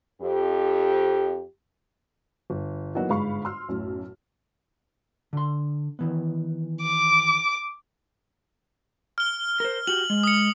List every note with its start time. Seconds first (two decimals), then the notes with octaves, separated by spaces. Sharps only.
0.21 F2 G4
2.50 G1
2.95 E3 F#3 A#3 B3 D#4 F#4
3.09 G1 G#2 G#3 F5 B5 C#6
3.45 C6 E6 F6
3.68 B1 F#2 A2
5.33 D3 C6
5.99 D#3 E3 B3
6.83 D6
9.18 F6 G7
9.60 A#4 C5
9.87 F#4 G4 F#7
10.10 G#3
10.24 D#6 C#7